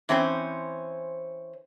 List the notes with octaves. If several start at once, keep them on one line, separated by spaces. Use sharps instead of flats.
E3 C4 C#4 C5